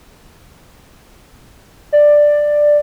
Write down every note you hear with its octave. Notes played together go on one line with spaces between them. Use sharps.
D5